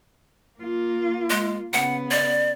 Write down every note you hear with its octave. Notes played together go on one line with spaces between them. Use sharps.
A#3 F4
G#3
C#3 B3 F#5
D5